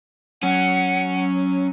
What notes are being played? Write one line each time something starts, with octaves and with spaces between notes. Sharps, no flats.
F#3 C#4 F#5